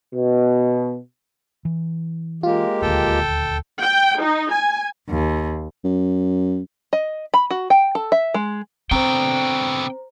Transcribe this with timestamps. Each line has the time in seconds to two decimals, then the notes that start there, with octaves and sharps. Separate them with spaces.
0.14 B2
1.65 E3
2.43 G#3 A#3 F4 G4
2.82 D#1 D2 A4 G5
3.81 G5
4.21 D#4
4.53 G#5
5.10 D#2
5.84 F#2
6.93 D#5
7.34 B5
7.51 F#4
7.70 G5
7.95 A4
8.12 E5
8.34 G#3
8.91 B2 D3 C4 C5 G5 A#5